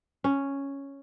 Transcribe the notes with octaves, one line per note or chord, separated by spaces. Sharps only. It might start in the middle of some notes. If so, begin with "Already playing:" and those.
C#4